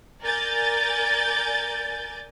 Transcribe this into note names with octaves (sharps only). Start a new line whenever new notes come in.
A#4 D5 G#5 G6 A6